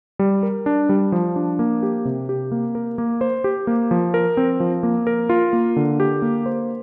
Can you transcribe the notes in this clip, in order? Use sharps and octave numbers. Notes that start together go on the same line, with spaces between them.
G3
A#4
D4
G3
F3
D4
A#3
G4
C3
G4
A#3
A#4
A#3
C5
G4
A#3
F3
A#4
C4
F3
A#3
A#4
F4
A#3
D3
G4
A#3
C5